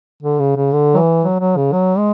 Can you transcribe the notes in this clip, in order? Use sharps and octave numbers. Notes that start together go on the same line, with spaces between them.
D3
C#3
C#3
D3
F#3
E3
F#3
F#3
C#3
F#3
G#3